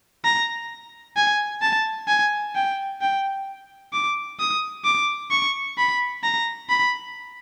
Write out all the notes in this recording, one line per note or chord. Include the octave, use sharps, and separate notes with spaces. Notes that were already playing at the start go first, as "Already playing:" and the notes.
A#5
G#5
A5
G#5
G5
G5
D6
D#6
D6
C#6
B5
A#5
B5